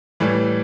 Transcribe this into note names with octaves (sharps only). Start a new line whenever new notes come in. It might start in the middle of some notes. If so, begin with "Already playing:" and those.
A2 E3 G3